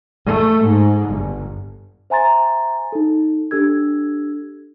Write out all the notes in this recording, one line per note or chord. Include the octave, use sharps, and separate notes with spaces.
A3
G#2
G1
C5 E5 G#5 A#5 C6 A6
D#4 A4
D4 G4 A4 E6 G#6